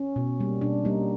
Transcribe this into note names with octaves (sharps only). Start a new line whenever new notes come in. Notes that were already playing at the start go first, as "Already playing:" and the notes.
Already playing: C#4
B2
G3 A#3
B2 D4
G3 A#3 D#4